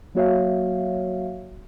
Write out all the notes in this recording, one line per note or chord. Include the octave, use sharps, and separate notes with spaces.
F#3 A#3 F#4 C#5 E5 F5